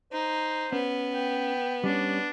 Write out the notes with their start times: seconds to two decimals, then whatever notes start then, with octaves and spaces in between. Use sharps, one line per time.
0.12 D#4 C5
0.72 B3 C#4
1.14 G5
1.84 G3 C#4 D4 C#5